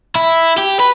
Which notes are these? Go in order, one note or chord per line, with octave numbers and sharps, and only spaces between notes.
E4
G4
B4